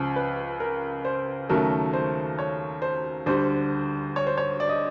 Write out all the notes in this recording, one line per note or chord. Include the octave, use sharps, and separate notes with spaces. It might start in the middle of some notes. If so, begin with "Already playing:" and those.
Already playing: C#2 C#3 F3
B4
A#4
C5
D#2 C#3 F#3 A3 A#4
C5
C#5
C5
D2 D3 G3 C5
C#5
C5
C#5
D5
D#5